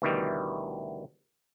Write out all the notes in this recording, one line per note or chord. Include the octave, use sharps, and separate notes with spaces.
D2 B2 D#3 E3 G3